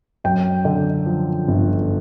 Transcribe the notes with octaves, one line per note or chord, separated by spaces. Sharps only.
F#2 G5
D3
F3
G1